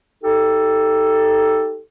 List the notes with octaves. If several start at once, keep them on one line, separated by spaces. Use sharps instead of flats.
D#4 G4 A4